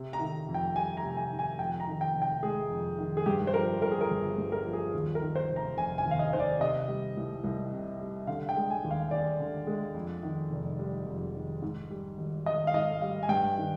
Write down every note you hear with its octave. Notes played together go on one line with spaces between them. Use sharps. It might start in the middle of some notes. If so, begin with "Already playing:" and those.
Already playing: C3
A#5
D#3
F2
G5
G3 G#5
A#5
C3
G#5
D#3
G#5
F2 G5
A#5
D#3
G5
F1
G5
G#3 G#4
F2
D#3
G#4
G2 G4
C5
F3 A#4
G1 A#4
G#4
A#4
G1
G2
A#4
F3
G#4
D#2
A#4
D#3
C5
F1
A#5
F1 G#5
G#5
D#2
F5
D#5
D#3 C5
D5
C3 D#5
G3
C2
C2
C3
G3
D3 F5
G5
G#3
G#5
D#2
F5
D#2 D5
D3
G#3
F2
D#3
F1
G3
F2
D#3
G#2
G3
G#1
G#1 D#5
F5
G#2 D#5
G3 F5
G#5
G2 G5
D#3